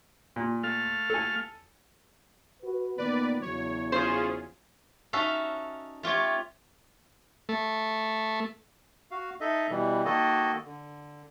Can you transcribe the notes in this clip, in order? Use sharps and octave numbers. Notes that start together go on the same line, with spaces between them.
A#2
A3 F5 F6
A4 G#5
F#4 B4
A#2 D#3 B3 B4 D5
E2 C#3 F#3 C#5
C#4 F4 G#4 C5
C#4 D#4 F#4 A4 E5 F5
A3 F4 G4 C#5
A3
F#4 F5
D#4 A4 D#5 E5
B2 E3 G3
D#3 A#3 F#4 A4 D#5
D3